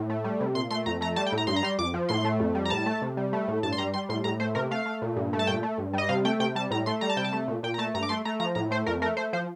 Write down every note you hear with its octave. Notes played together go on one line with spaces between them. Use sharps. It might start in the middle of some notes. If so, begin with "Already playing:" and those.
Already playing: A2
A3
G3
C3
A#2 C6
A3 C6
F2 A#5
A3 A#5
G3 A5
G5
A2
A#5
G2 C6
A#5
G3 C6
F2 D6
F3
A2 C6
A3
F2
G3
A#5
A2 A5
A3
C3
G3
A3
A2
G2 A5
C6
G3 A#5
G3 C6
A2 C6
A2 A#5
A3 C5
C3 A#4
A3 F5
A3
A#2
G2
A3
A5
A#2 G5
A3
G2
G3 D#5
C3 F5
A3 G5
C3 G5
G3 A5
A2 A#5
A3 C6
G3 A#5
A5
C3 G5
A5
A3
A#2
A#2 G5
A#5
A3 A5
G2 A#5
D6
A3 C6
A3 A#5
F3 A#5
A2 A#5
A3 C5
F2 A#4
A3 A#4
A3 C5
F3 C5